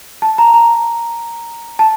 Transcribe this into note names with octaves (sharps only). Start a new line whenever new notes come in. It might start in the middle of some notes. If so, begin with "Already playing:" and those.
A5
A#5
A#5
A5